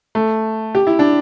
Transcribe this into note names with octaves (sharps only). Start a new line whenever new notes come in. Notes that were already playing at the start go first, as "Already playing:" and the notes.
A3
G4
E4
D4